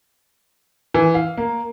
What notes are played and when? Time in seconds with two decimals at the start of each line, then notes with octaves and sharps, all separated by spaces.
0.94 E3
1.14 F5
1.37 A#3